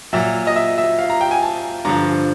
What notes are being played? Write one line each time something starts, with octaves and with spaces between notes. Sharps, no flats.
A#2 F#3 E5
D#5
E5
E5
F5
A#5
G5
G#5
A5
G2 D3 F3 A#5